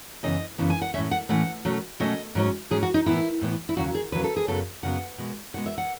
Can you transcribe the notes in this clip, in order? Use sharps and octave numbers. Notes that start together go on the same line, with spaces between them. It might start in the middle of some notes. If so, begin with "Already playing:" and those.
F#2 C#3 E3 B3 D#5
F#2 C#3 E3 B3
G#5
F#5
A2 E3 A3 C#4 E5
F#5
A2 E3 A3 C#4 F#5
B2 F#3 A3 C#4
B2 F#3 A3 C#4 D#5
G#2 F#3 C#4
G#2 F#3 C#4 G#4
F#4
D#4
A2 E3 B3 E4
A2 E3 B3
E4
D#2 C#3 F#3 F#4
G#4
D#2 C#3 F#3 B4
A4
G#4
F#2 C#3 F#3 B3 A4
F#2 C#3 F#3 B3 F#5
B2 G#3 B3
B2 G#3 B3 F#5
E5
F#5